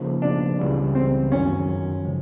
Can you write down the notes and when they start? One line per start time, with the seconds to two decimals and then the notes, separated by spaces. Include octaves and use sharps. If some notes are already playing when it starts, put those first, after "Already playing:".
Already playing: C#3 F3 A#3 D#4
0.22 D4
0.59 C#2 C#3 E3 G3
0.95 C4
1.32 F#2 D#3 F#3 C#4
2.05 C#3 F3 G#3